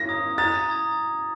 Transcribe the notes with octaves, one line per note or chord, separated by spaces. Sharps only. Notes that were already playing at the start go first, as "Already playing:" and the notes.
Already playing: A#6
A#5 D#6 G#6
A#5 D#6 G#6 A6
A#5 D#6 G#6